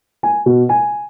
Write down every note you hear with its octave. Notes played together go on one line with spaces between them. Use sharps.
G#5
B2
G#5